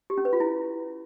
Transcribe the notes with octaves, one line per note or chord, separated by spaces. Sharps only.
G4
C#4
B4
F4
E4